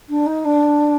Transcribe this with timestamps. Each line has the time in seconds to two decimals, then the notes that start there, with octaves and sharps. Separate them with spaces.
0.09 D4
0.26 D#4
0.45 D4